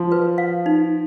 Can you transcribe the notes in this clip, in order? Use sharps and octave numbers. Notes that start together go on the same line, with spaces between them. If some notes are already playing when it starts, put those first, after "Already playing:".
Already playing: F3 F#4
B4
F5
D#4